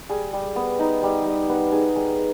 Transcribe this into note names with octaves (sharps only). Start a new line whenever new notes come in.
G3 G#4
G3
B3
D#4
G3
G3
B3 B4
D#4 G#4
G3 G#4